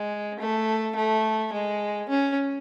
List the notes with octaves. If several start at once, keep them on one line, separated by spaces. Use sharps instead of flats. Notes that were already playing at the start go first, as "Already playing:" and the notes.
Already playing: G#3
A3
A3
G#3
C#4